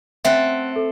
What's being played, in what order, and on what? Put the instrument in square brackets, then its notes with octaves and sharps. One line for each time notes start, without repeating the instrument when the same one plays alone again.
[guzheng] A3 C4 [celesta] E5 F#5 F#6
[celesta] A4